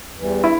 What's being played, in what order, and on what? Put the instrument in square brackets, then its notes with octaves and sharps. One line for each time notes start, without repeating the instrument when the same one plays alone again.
[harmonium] E2 E3 G3
[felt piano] E4